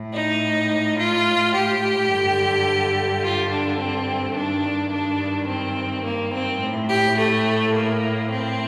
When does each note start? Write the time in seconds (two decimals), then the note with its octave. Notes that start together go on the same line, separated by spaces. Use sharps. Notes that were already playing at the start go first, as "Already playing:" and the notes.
Already playing: A2
0.12 D#4
0.97 F4
1.53 G4
2.10 G2 D3
3.23 F4
3.50 D4
3.79 C4
4.36 G2 D#3 D4
4.92 D4
5.48 C4
6.04 A#3
6.33 C4
6.61 A2
6.89 G4
7.17 A3
7.74 A#3
8.30 C4